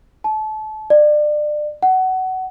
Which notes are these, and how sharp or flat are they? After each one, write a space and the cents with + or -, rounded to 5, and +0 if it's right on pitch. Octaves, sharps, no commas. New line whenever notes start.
A5 -30
D5 +30
F#5 +20